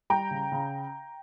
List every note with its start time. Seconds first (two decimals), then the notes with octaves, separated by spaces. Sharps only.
0.10 G3 G5 A#5
0.31 C#3
0.52 C#3